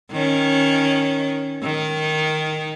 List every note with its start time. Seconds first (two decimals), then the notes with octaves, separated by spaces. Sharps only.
0.12 D#3 C#4
1.63 D#3 D#4